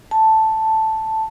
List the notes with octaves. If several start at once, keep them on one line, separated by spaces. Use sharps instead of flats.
A5